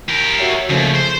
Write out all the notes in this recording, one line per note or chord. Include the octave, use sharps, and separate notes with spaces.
G4 A#4
F#4 C#5 E5
D#2 C#3 F3 A3
C5